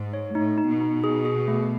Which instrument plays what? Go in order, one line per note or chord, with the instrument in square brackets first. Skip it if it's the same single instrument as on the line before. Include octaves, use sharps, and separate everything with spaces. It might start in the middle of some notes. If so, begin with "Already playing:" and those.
Already playing: [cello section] G#2
[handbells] C#5
[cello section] A2 [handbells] D#4
[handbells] D#4
[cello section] B2
[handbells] D#4
G#4
G#4
A3